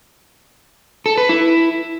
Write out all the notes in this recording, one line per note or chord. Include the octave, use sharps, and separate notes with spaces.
A4
B4
E4